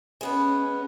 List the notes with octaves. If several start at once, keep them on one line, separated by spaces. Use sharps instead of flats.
G#3 B3 C#4 B4